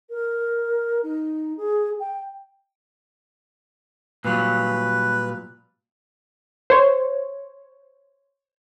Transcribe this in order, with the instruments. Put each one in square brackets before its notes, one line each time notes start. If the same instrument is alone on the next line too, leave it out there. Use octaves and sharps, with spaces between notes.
[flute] A#4
D#4
G#4
G5
[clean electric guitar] A#2 F#3 G3 [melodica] B4
[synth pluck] C5 C#5